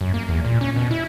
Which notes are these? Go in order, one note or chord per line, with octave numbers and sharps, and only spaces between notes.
F#2
A#3
E2
A#2
C#4
B2
E4